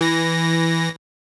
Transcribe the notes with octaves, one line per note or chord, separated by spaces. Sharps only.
E3 A#6